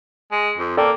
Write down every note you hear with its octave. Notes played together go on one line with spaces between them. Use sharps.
G#3
F2
A#3 A4 D5 G5